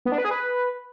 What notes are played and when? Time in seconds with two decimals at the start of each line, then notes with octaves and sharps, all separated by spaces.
0.05 B3
0.12 D4
0.18 B4
0.25 G#4
0.31 B4